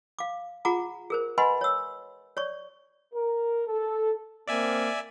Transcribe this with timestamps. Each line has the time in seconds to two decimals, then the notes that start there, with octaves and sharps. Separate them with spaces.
0.19 F5 D6
0.65 F4 G#4 F#5 A#5 D6
1.10 G#4 A#4 C5
1.38 B4 D#5 F#5 G#5 B5 C6
1.61 C#5 E6
2.37 C#5 D5 C#6
3.14 A#4
3.68 A4
4.47 A#3 C4 D5 E5 G#5